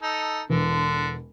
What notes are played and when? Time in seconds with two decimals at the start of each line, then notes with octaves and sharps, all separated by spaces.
0.02 D#4 A4
0.50 E1 D3 E3